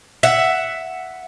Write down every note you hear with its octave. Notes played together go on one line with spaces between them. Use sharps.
E5 F#5